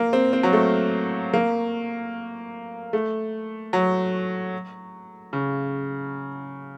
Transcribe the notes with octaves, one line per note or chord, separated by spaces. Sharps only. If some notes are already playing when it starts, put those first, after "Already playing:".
Already playing: A#3
C4
C4
F#3
A3
A#3
A3
F#3
C#3